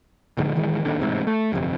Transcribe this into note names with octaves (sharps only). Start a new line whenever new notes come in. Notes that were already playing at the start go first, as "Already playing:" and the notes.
D1 A#1 G#2 D3
D1 D#3 E3 G#3
D1 D#2 D3
A1 G#2 C3
A3
G1 F2 C3